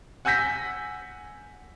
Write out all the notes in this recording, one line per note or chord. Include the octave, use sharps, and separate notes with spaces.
F#5 G#5 E6 G6 A#6 B6